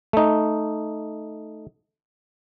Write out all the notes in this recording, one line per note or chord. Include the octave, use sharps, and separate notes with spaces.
A3 D#4